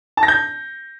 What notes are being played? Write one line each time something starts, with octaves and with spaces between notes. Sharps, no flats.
A5
A#6
G6